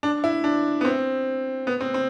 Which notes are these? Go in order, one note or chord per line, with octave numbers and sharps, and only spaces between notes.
D4
E4
D4
B3
C4
B3
C4
C4